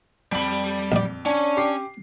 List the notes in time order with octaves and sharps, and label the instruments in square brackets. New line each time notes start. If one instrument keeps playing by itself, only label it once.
[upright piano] F2 F#7 [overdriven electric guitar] G3 B5
[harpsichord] A#1 D5
[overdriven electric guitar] C#4 [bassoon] D4
[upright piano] G4 D6 C7